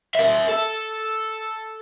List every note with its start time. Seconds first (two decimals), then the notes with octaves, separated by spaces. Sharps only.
0.15 A#4 E5
0.49 A4